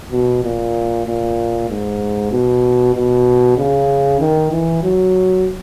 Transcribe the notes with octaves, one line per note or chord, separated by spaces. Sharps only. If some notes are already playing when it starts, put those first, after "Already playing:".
B2
A#2
A#2
G#2
B2
B2
C#3
D#3
E3
F#3